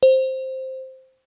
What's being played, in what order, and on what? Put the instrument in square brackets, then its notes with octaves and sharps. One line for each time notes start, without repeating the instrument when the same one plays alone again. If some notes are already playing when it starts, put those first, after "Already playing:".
[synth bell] C5